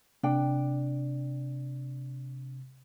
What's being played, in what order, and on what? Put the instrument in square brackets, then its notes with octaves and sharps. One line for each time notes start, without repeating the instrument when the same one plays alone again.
[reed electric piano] C3 [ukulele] D4 G5